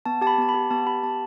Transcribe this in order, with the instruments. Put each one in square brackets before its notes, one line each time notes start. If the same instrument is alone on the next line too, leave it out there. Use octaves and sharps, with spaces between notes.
[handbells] B3 A5
G4 A5
B5
B3 A5
B5
G4
B3 A5
G4 B5
B3 A5